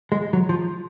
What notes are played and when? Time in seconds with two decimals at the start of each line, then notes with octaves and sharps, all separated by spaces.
0.12 G#3
0.33 F#3
0.49 F3